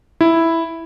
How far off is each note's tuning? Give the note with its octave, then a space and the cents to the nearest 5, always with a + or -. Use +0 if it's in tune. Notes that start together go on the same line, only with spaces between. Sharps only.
E4 +0